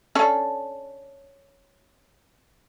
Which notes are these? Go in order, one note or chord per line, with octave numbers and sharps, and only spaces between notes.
C#4 D4 A4